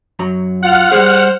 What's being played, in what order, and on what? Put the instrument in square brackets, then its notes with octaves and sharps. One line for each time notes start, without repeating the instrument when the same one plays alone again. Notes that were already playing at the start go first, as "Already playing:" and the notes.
[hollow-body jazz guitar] F#2 F#3 A#5
[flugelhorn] F4 [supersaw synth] F#5 F6
[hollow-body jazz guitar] G3 G#4 [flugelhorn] C5